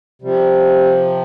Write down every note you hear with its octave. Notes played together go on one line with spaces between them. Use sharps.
C3 F3 G3